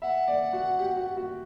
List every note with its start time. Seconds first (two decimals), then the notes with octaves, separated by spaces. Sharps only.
0.02 E5 F#5
0.27 D5
0.53 F#4
0.79 G4
0.97 F#4
1.17 F#4